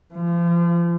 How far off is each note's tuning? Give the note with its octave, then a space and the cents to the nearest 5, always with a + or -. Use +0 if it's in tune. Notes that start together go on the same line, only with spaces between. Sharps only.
F3 -35